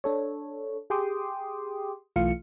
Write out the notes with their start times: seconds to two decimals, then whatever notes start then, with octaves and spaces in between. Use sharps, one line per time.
0.04 D4 A4 C#5
0.90 G4 G#4 G5 C6 D6 D#6
2.16 B1 E3 A3 F4 F5 C#7